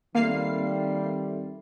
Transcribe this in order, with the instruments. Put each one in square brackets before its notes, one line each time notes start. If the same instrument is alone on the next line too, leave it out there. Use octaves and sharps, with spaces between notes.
[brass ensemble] D#3 G3 [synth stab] A#3 F5 C7 [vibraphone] C4 A4 E5